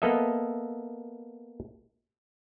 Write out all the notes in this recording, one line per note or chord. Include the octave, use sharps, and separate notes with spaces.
A#3 B3 A4 D#5 E5